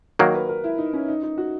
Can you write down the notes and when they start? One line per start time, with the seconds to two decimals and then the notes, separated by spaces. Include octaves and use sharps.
0.19 D#3 F#3 A#3 A#4
0.34 B4
0.49 A#4
0.64 E4
0.78 D#4
0.93 C#4
1.08 D#4
1.23 D#4
1.38 F#4